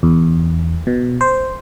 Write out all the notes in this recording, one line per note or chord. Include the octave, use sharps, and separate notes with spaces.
E2
B2
C5